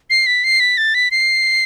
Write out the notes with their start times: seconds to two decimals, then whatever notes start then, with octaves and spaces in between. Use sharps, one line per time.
0.10 C7
0.26 B6
0.44 C7
0.60 B6
0.78 A6
0.94 B6
1.11 C7